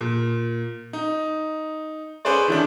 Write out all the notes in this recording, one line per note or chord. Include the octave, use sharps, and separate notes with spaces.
A#2
D#4
C#4 G#4 B4 C5 D5
D#3 E3 D4